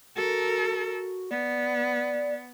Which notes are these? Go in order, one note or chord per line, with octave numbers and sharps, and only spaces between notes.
F#4 A4 A#4
B3 D5